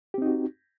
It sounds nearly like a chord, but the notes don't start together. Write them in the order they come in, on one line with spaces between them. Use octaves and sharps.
G4 C4 D#4 F#4